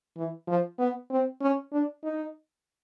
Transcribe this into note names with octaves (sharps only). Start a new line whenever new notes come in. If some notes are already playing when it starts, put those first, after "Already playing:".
E3
F3
B3
C4
C#4
D4
D#4